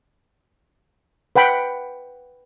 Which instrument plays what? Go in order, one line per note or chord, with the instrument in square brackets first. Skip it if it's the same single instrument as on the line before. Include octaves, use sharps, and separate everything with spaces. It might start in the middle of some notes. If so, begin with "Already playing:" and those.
[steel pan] B4 F#5 G5 B5